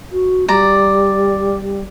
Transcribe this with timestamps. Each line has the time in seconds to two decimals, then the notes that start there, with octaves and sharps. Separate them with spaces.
0.12 F#4
0.48 G3 D5 A#5